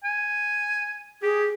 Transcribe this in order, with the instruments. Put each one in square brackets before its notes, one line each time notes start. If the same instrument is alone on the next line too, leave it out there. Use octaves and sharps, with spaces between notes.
[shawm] G#5
[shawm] G4 [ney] G#4